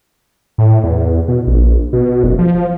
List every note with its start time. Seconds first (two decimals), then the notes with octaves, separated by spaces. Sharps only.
0.58 A2
0.83 E2
1.28 B2
1.47 A#1
1.93 B2
2.24 F#1
2.39 F3